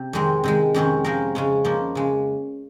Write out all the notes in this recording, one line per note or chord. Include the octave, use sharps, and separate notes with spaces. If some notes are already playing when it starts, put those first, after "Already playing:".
Already playing: C3
F2 D#3 G#3 C4
C3 D#3 G#3
F2 C3 D#3 G#3 C#4
F3 G#3 D#4 A#4
C#3 G#3 C#4
F3 A#3 D#4
C#3 G#3